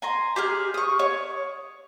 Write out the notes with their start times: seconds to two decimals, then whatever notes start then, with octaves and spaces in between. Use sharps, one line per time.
0.02 G#5 A#5 C6
0.36 G4 G#4 F6
0.74 C#6 D#6
0.99 C#5